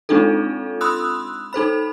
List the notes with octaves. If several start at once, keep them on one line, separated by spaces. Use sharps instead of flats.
G#3 C4 D4 D#4 F4 A4
B5 C6 D#6 E6 F#6
D#4 A4 C5 B5